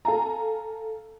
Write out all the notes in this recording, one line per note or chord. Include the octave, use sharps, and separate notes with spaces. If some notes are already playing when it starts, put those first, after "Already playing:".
A4 F5 G#5 A#5